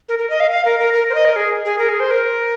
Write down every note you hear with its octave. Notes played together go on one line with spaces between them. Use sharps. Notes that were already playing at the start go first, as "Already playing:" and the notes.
A#4
A#4
D#5
F5
F5
A#4
A#4
A#4
C5
D#5
A#4
G#4
G#4
A#4
G#4
C5
A#4